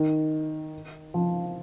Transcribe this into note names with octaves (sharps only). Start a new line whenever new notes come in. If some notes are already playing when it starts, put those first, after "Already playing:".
Already playing: D#3
F3